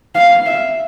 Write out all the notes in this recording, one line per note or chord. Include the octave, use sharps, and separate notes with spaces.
F5
E5